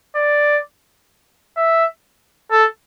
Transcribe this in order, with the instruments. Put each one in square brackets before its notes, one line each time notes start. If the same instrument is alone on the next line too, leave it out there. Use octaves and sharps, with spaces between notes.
[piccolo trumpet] D5
E5
A4